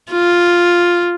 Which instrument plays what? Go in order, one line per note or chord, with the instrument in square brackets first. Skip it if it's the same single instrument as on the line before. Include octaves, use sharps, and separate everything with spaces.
[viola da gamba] F4